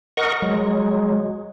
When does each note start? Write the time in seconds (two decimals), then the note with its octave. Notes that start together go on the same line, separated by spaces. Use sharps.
0.17 A#4 D#5 F#5 C#6
0.42 F#3 G#3